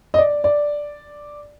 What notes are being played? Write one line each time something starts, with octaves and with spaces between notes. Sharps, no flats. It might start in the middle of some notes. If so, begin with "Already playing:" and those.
D#5
D5
D5